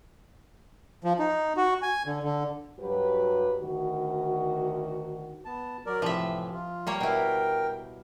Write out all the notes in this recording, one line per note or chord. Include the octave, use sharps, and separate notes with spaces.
F3
D#4
F#4
G#5
D3
D3
G2 F#3 F#4 G4 B4
D2 D#3 F#4
B3 A5
F#3 A#4 D5
A2 C3 E3 F3 E5
F4
G3 A#3 C#5
B2 E4 A#4 G5